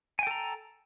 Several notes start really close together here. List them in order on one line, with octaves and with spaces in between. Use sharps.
G#5 G5 A4 A#5